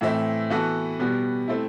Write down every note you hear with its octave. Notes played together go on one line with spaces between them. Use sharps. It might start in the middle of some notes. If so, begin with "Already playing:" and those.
A2 E3 A3 C4 E4
E3 B3 F#4 A4
B2 G3 B3 F#4
A3 C4 E4